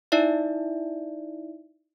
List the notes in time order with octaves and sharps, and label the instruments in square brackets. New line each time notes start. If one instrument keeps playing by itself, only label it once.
[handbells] D#4 E4 D5 E5